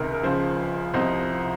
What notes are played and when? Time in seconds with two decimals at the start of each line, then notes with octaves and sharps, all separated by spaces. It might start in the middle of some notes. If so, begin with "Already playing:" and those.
Already playing: C#2 C3 D#3 A#4
0.12 A#4
0.23 C#2 C#3 F3 C5
0.94 C2 C3 F3 C5 D#5